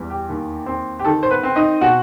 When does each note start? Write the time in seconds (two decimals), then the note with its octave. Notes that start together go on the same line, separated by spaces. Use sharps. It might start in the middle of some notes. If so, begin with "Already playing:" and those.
Already playing: E2 G3
0.10 G4
0.29 D#2
0.66 C4
0.99 G4
1.05 D#3 A4
1.23 C5
1.31 B3 B4
1.43 C4
1.56 D#4 D#5
1.81 B2 F#4 F#5